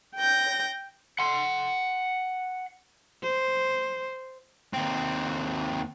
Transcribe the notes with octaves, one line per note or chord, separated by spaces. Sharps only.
G5 G6 A#6
F#5 C6
C5
D#2 C4